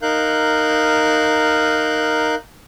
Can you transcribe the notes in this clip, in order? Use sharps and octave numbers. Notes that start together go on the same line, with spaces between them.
D#4 A#4 F5 F#6 G6